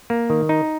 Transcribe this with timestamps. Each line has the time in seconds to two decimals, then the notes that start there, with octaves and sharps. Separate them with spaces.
0.10 A#3
0.30 D#3
0.49 D#4